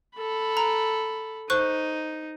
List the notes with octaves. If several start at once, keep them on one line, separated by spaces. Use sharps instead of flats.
A4 B5
A#5
D#4 C5 C#6 F#6